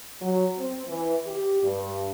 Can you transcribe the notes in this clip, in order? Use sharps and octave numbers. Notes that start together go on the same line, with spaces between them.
F#3
C4
E3
G4
G2